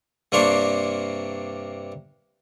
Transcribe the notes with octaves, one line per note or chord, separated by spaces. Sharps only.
G2 C3 A#3 D4 C#5 C6